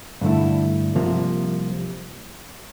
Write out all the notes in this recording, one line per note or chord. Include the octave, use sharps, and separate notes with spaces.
G2 D3 A3 E4
C2 C3 F3 A#3